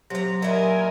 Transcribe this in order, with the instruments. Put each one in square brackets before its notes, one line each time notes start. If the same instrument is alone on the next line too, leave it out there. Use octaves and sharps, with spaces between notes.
[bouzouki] C3 A#5 [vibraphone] F#3
[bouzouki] A#2 E4 [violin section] A#4 D#5 G#5